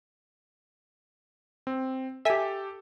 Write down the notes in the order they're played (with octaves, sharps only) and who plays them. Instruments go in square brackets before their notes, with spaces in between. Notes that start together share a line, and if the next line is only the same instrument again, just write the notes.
[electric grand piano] C4
[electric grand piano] G4 A4 [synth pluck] E5 G#5 B6